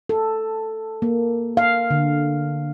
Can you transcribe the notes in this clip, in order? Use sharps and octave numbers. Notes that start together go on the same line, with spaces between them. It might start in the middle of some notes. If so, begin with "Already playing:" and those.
A4
A#3
F5
D3